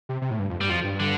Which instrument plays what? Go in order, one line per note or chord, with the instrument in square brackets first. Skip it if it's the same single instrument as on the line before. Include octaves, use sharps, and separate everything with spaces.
[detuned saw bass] C3
C3
A2
G2
F2
[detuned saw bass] G2 [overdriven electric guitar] G3
[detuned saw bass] F2 [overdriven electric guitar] F3
[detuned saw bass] G2
[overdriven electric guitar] D3